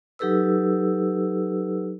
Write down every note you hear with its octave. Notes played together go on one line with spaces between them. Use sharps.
F#3 D#4 G4 A4 B4 E6